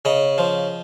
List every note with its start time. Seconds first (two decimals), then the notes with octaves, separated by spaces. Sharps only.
0.05 C#3 D#5
0.38 F3